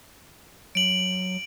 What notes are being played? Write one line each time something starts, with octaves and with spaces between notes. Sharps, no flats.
F#3 D7 F#7